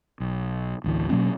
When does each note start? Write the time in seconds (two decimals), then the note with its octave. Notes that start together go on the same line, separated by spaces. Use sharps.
0.20 B1
0.84 A1 D2 E3
1.10 B2 F#3 A#3 C#4